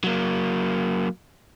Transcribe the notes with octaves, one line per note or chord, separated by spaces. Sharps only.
F#3 A#3